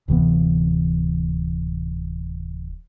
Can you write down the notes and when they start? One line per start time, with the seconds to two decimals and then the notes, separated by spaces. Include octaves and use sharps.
0.08 D1 C3 E3 B3